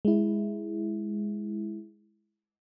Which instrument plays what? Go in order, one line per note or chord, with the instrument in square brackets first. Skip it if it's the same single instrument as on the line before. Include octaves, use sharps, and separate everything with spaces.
[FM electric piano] G#3 E4